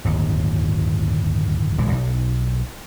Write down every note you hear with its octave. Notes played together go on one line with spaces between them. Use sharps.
D1 G1 D#2
D1 A#1 E3 G#3
B1